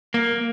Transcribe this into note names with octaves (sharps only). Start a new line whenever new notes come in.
A#3